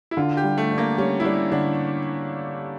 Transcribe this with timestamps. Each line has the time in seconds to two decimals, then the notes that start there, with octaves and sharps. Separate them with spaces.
0.11 E4
0.17 D3 F4
0.37 G4
0.43 G3
0.58 A3
0.72 D4
0.78 A#3
0.97 G3 C#4
1.20 E4
1.25 G3 D4
1.52 D3 D4